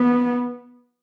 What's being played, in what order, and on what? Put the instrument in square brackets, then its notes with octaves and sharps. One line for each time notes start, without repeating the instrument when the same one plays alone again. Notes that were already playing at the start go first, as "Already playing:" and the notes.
Already playing: [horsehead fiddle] B3